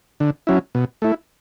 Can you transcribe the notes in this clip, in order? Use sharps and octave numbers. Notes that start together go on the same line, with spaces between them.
D3
F#3 C#4 E4
B2
A3 E4